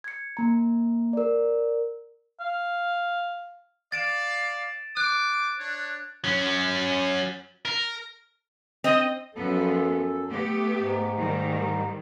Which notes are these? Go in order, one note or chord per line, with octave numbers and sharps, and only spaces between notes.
G#6 C#7
A#3 A#5
A#4 D5
F5
D5 F5 A6 D7 E7
C5 D6 F#6
D4 C#5
F#3 C#4
A#4
C4 D#5
F#2 F3 F#3 B3 A4
A3 B3 G4
G#2
D#3 G3 A3